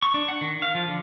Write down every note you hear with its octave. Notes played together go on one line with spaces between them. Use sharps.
C#6
D4
F#5
D#3
F5
F3
D3